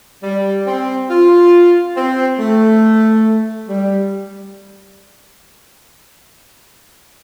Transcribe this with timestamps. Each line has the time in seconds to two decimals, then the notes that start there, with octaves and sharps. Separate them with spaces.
0.23 G3
0.66 C4
1.10 F4
1.96 C4
2.38 A3
3.68 G3